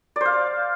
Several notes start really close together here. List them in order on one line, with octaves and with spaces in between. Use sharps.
D5 C5 F5